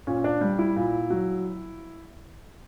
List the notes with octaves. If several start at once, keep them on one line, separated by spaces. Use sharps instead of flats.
A#2 C#4
D4
G3
E4
A#2
F#3